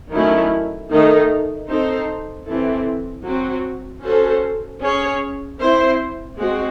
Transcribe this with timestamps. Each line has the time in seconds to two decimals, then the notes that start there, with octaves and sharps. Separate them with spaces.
0.12 D#3 F#3 A3 C#4 E4
0.90 D#3 A3 D#4
1.68 C4 D#4 A4 C5
2.46 E3 C4 E4 A4
3.24 F#3 C4 F#4
4.02 C#4 F#4 A4 C5
4.80 C#4 G#4 C#5
5.59 C4 E4 C5
6.37 G#3 C4 F#4